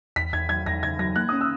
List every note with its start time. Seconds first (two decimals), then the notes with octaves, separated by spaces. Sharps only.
0.16 E2 B6
0.33 E2 G#6
0.49 F#3 G#6
0.66 E2 A#6
0.83 C#3 G#6
0.99 F#3 A#6
1.16 A#3 F#6
1.29 C#4 D#6
1.41 E6